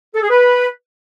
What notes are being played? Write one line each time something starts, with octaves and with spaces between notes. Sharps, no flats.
A4
G#4
B4